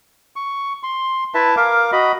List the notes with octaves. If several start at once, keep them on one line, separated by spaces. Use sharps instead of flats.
C#6
C6
E4 B4 E5 A5
A#4 F5 D6
F#4 D#5 B5